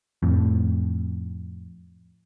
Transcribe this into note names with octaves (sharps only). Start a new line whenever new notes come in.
F2 A2